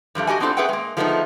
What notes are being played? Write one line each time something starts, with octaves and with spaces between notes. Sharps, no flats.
G2 F3 G3 A3
F#4 G4 D#5 G#5
B3 C4 D4 F4 A4 C5
C#4 G#4 B4 E5 F#5 G5
G#3 A#3
F3 G#3 A3 B3 D4 D#4